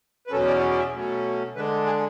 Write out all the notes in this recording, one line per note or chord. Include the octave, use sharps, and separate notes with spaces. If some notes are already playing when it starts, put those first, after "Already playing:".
B4
E2 B2 F#3 C#4 A4
D5
D5
E5
B2 F#3 A3 C#4
D3 G#3 D4 B4
G#4